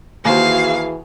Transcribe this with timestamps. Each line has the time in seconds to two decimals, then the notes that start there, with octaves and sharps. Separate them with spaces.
0.25 D#2 E3 F#4 G#4 C5 F5